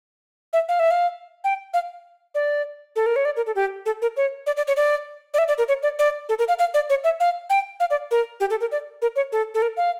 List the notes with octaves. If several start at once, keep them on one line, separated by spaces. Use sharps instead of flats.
E5
F5
E5
F5
G5
F5
D5
A4
A#4
C#5
D5
A#4
A4
G4
A4
A#4
C#5
D5
D5
C#5
D5
D5
E5
D5
A#4
C#5
D5
D5
A4
A#4
F5
F5
D5
C#5
E5
F5
G5
F5
D5
A#4
G4
A4
A#4
D5
A#4
C#5
A4
A4
A#4
F5